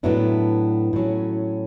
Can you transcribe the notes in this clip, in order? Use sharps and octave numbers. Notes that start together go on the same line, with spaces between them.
A2 F#3 B3 D4 E4
A2 F#3 C#4